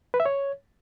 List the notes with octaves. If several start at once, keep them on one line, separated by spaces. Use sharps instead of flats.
B4
E5
C#5